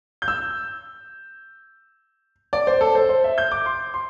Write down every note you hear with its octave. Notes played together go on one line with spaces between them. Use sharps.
G6
E6
D5
C5
A4
C5
C5
E5
G6
D6
C6
C6